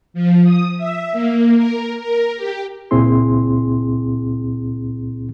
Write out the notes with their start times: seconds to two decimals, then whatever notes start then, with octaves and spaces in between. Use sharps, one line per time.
0.14 F3
0.43 D#6
0.77 E5
1.13 A#3
1.56 A#4
2.00 A#4
2.36 G4
2.91 C#2 A#2 C4 E4 G#4 C6